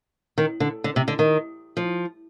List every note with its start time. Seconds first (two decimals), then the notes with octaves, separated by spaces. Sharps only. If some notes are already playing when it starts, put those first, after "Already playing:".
0.38 D#3
0.60 D3
0.84 D3
0.96 C3
1.08 D3
1.19 D#3
1.77 F3